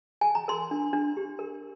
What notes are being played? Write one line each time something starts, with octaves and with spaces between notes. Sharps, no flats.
G#5
A#5
A#4 C6
D4
D4
G4
A#4